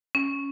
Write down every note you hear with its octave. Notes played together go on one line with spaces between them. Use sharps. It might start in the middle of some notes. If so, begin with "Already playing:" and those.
C#4